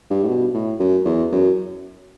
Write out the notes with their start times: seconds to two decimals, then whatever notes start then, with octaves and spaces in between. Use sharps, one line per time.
0.10 G2
0.24 A2
0.28 B2
0.54 A2
0.80 F#2
1.05 E2
1.32 F#2